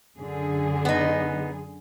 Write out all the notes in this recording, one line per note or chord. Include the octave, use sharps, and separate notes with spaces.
F#2 D3 G#4
B3 D#4